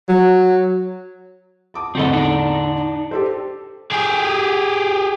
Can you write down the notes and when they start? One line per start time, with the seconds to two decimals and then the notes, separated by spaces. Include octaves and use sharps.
0.09 F#3
1.74 A5 D6 D#6
1.95 E2 A2 D3 C4 A4 D#5
2.13 D4 D#4
3.11 G4 A4 C5
3.92 G4 G#4